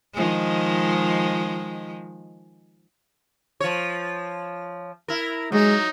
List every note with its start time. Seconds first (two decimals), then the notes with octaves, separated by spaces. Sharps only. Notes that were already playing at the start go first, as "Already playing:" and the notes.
0.14 D#3 F3 G#3
3.60 F3 C#5
5.08 E4 A#4
5.52 F#3 G#3 D#4